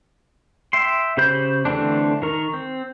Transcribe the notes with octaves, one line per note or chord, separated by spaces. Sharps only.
E5 G5 C6
C#3 G4 C5 B5 G6
D3 E3 A3 C4 D4
D#3 A#4 C#6
C4